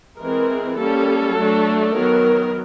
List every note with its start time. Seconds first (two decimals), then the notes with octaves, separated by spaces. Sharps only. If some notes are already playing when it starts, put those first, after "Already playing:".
0.19 E3 G#3 C4 A#4
0.77 G3 A#3 C#4 A4
1.36 F#3 A3 D4
1.94 D#3 F#3 B3 A#4